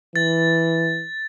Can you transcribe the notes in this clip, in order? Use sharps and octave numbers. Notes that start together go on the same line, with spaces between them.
E3 A6